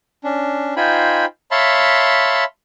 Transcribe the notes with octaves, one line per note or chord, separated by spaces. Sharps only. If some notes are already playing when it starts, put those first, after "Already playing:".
C#4 D4
D#4 F4 C5 G5 G#5 B5
C#5 E5 F5 A5 B5 C6